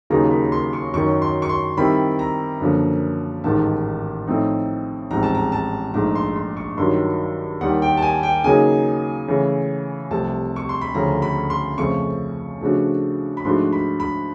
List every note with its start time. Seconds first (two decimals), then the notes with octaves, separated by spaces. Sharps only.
0.10 D#2 C#3 F#3 A#3 D#4 A#5
0.31 B5
0.52 C6
0.73 C#6
0.93 F#2 D#3 F#3 C#6
1.22 C6
1.42 C#6
1.49 C6
1.77 D#3 G3 C4 E4 B5
2.19 A#5
2.61 F#2 D3 F3 A#3
3.44 A1 G#2 D#3 A5
4.27 A2 F3 A3 C4 D#4
5.11 A1 G#2 F3 G#3 C4 A#5
5.23 A5
5.35 A#5
5.52 A5
5.94 A#1 G#2 F3 A3 A#5
6.15 C6
6.36 C6
6.57 C#6
6.78 G2 D#3 F#3 C6
7.61 D#2 D#3 G3 F#5
7.82 G5
7.97 A5
8.02 G#5
8.23 G5
8.44 C#3 F#3 A#3 D#4 G#4 G#5
9.28 C#3 E3 A3
10.11 C2 C3 F3 A3 A5
10.56 C#6
10.69 C6
10.81 B5
10.94 D2 C#3 F3 A3 C#4 A#5
11.22 B5
11.50 C6
11.78 F2 C#3 F3 A3 C#4 C#6
12.61 C#3 F3 A3 D4 F#4
13.37 B5
13.45 G#2 F3 A3 D4 F#4 C6
13.73 B5
14.00 B5